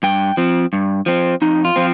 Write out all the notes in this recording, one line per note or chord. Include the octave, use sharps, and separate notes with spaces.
G2 G5
F3 C4
G2
F3 C4
F2 D#4
F4
F3 C4